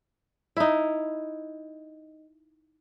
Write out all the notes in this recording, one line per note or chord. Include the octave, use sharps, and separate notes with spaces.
D#4 E4